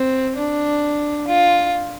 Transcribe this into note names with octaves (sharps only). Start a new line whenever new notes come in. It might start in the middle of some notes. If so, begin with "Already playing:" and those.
Already playing: C4
D4
F4